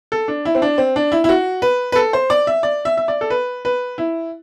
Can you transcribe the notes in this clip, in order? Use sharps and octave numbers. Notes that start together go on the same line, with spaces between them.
A4
D4
E4
C4
D4
C4
D4
E4
E4
F#4
B4
B4
A4
C5
D5
E5
D5
E5
E5
D5
A4
B4
B4
E4